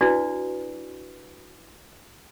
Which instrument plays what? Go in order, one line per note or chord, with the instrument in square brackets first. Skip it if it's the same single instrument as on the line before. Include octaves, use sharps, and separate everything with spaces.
[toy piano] D4 E4 F#4 B4 D5